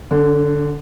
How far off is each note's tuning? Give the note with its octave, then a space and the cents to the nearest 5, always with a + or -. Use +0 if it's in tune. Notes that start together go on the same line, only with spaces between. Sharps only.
D3 +0 C#4 +45